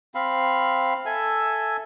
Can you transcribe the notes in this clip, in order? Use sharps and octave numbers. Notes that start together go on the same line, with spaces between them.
C4 F5 B5
A4 E5 G#5